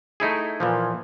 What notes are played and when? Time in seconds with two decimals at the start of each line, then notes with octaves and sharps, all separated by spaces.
0.20 A3 D#4 E4 G#4
0.60 A#2 E3 F3